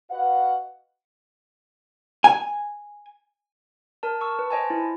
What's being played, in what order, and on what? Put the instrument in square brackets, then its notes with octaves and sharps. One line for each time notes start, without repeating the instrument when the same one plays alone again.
[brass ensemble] F#4 B4 D#5 F5 F#5
[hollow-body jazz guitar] G#5
[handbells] A#4 A5
A5 C#6 E6
B4
C5 D#5 G#5 A5
E4